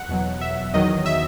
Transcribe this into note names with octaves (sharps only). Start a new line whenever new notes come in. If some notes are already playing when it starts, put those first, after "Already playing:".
Already playing: F#5
E2 B2 F#3
E5
E2 D#3 F#3 D#5
E5